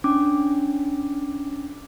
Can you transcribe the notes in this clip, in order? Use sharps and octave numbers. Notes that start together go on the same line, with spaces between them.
C#4 D4 D6